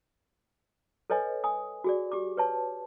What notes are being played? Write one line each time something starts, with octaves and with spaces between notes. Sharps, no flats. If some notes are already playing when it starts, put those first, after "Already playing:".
A4 B4 C#5 D#5 G#5
G#5 D#6
F#4 G#4 D5
G4 D6
B4 C#5 A5